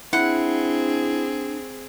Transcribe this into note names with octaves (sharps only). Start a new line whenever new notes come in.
C4 D4 E4 G#4 F#5